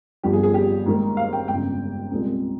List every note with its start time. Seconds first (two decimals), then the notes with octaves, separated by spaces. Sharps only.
0.23 G1 G2 F3 G4
0.33 G#4
0.43 G#4
0.54 G4
0.86 G#2 D#3 A#3
1.17 F5
1.33 G5
1.48 G1 F2 C#3 G5
2.11 C2 A#2 G#3 C4